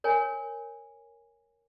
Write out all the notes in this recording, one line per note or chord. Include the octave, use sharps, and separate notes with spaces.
A#4 C#5 G#5